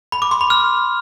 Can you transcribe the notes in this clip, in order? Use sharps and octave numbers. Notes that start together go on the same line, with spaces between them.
B5
D6
C6
B5
F6